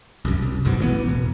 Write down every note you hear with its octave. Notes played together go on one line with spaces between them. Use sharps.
C2 F#2
C2
F#1 B1 G#2 B2
A1 E3 A#3 B3
E1